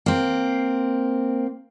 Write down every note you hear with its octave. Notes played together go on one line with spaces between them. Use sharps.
A#3 C4